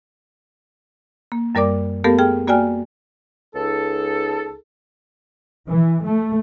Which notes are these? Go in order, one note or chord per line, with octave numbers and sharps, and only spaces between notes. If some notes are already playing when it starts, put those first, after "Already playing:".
A#3
F#2 G3 A#4 D5 D6
A3 B3 G4 A4 A#4 F5
G#4 G5 F6
A#3 F#4 D5 G5 G#5 F6
C#2 D#4 G#4 A4
E3
A3